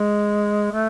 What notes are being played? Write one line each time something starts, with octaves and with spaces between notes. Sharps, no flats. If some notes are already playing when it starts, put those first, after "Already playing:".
Already playing: G#3
A3